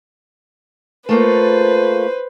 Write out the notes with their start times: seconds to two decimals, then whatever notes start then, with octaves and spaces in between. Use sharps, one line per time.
1.09 A3 A#3 F4 B4 C5